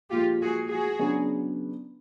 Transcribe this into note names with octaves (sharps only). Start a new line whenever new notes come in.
A#2 F3 G#3 F4 G4
F#4 G#4
F#4 G#4
C#3 F#3 B3 D4